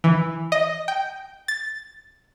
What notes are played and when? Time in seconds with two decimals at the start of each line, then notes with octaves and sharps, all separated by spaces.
0.04 E3
0.52 D#5
0.88 G5
1.48 A6